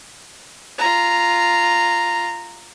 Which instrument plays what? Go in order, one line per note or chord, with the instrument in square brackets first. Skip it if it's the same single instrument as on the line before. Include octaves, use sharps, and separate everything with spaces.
[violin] F4 A#5